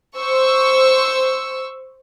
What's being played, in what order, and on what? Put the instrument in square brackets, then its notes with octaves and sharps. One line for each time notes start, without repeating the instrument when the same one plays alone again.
[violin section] C5 C#6 E6